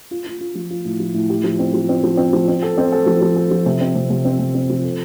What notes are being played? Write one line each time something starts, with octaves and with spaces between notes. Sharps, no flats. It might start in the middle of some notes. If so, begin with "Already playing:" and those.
F4
F4
F4
F3
F4
A2
F3
A2
G4
F3
C4
F3
C4
F3
C4
F3
C4
A4
C4
A4
F3
F3
A4
F3
C3
C4
C3
C3
C4
C3
C4
F3
A4